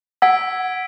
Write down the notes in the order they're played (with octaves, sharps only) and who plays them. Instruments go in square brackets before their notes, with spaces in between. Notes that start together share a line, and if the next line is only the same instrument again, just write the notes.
[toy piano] F#5 [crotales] E6 G#6 B6 D7